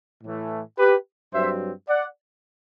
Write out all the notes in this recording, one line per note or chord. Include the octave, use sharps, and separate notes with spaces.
A2 E3 A3
G4 B4
G2 F#3 C4 C5 E5
D5 F#5